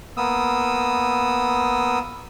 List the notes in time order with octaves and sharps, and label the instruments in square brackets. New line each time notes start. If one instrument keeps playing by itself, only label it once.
[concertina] A#3 B3 D#6 E6